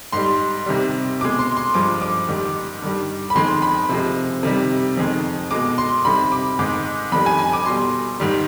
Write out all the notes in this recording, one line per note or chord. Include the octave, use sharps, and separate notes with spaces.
G#2 G3 C6
C3 D#3 G3
B2 G#3 D6
C6
C6
G2 F3 G#3 D6
D6
G#2 D#3 G3
G2 D#3 G3
B5
F2 D#3 G#3 C6
B5
C3 F3 G#3
C3 D#3 G3
F2 D#3 G#3
B2 G#3 D6
C6
C3 D#3 G3 B5
D6
G#2 D#3 G#3 D6
F2 D#3 G3 B5
G#5
G#5
D6
B2 G3 C6
G#2 D#3 G3